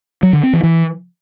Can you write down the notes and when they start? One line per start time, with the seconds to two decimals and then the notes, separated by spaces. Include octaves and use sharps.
0.23 F#3
0.33 D3
0.43 C4
0.53 E3
0.63 E3